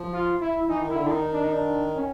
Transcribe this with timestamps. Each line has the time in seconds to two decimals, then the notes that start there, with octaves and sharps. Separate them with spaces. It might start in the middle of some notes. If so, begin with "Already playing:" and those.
Already playing: F3
0.13 F4
0.41 E4
0.68 E3 D#4
0.82 D#3
0.90 D3 E4
1.06 D#3 D4
1.11 D#4
1.33 D4
1.44 D#4
1.53 D4
1.95 C#4